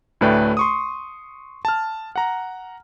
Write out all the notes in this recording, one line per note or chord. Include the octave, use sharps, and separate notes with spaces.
D2 A2 A3 B4 D5 G5
C6 C#6 D#6
A5 F6
F#5 A#5